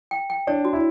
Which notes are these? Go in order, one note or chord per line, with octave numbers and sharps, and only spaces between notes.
G5
G5
D4 C#5
F#4
E4